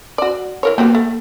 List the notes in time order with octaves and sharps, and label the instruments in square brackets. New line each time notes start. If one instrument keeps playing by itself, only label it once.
[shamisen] F#4 D5
E3 A#4 C#5
[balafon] A#3 [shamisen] B3 F#4 G4
[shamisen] A3